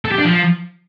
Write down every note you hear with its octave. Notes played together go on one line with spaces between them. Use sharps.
A4
G4
D4
F3